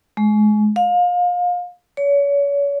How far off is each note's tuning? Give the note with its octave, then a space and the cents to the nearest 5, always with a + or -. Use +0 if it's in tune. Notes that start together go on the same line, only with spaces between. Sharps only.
G#3 +30
F5 +30
C#5 +35